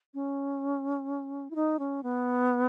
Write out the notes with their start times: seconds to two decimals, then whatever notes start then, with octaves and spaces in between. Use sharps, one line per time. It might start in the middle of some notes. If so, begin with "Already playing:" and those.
0.14 C#4
1.50 E4
1.55 D#4
1.79 C#4
2.03 B3